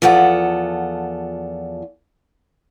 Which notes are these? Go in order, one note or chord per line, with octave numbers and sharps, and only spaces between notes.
E2 F3 F4 A4 B4 F#5